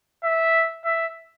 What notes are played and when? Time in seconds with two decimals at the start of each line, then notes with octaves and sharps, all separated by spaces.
0.24 E5
0.85 E5